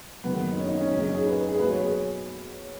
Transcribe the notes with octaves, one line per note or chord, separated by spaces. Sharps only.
F#1 F#2 D#3 B3
D#4
C#4
D#4
C#4
F#1 F#2 C#3 C#4
D#4
G#4
B4
B4
G#4
B1 B2 B4
C#5
G#4